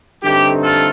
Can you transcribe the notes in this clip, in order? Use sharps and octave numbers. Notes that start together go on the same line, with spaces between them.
G2 D3 A3 C4 D#4 G4
F4 A4